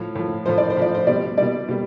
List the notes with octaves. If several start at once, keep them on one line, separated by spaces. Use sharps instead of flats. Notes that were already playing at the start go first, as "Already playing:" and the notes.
Already playing: A2 F3
A2 F3
A2 F3 C5
D5
C5
A2 F3 D5
C5
B2 G3 D5
B2 G3 D5
B2 G3